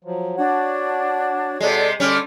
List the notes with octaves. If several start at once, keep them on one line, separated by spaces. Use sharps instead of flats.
F3 F#3
D4 F#4 C#5 F#5
C3 G#3 A4 D5
D3 G3 C#4 D6 F6